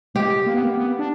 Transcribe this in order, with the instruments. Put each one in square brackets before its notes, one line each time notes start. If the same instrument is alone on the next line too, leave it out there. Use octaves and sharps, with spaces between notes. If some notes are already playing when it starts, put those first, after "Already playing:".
[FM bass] G#3 [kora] G4
[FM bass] A#3
B3
A#3
B3
D4